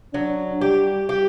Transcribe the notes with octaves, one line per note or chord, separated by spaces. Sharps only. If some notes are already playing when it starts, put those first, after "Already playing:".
F#3 D4
G3 G4
G4